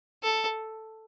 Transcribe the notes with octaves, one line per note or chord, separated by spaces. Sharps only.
A4